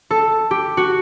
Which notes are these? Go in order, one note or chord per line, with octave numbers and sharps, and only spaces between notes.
A4
G4
F#4